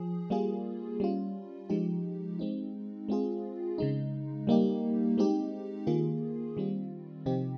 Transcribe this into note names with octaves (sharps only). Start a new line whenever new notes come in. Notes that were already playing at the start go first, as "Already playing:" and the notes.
Already playing: F3 G#4
G3 A#3 F4 G#4
G3 C#4 F4
F3 G#3 D#4 G4
G#3 C4 D#4
G#3 C4 F4 G#4
C#3 G#3 D#4
G3 A#3 D#4 G4
G#3 C4 D#4 G4
D#3 A#3 F4 G#4
D#3 G3 C4 F4
C3 F3 C4 D#4 G4